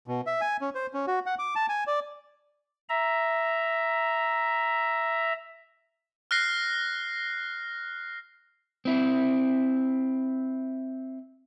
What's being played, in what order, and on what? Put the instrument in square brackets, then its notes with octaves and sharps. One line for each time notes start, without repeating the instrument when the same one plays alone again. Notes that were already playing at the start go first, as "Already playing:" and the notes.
[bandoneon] B2
E5
G#5
C#4
C5
C#4
F#4
F#5
D6
A5
G#5
D5
[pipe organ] E5 A#5
[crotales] F6 F#6 A#6 C7
[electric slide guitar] C4 E4